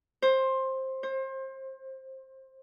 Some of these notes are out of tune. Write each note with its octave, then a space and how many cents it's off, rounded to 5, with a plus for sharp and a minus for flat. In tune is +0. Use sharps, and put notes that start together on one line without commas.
C5 +15
C5 +30